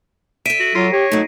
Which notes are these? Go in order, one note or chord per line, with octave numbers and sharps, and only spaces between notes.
A4 E5 B6 D7 D#7
F#4
F#3 F4 A#6 C7
G4 C#5
F#3 A3 D#4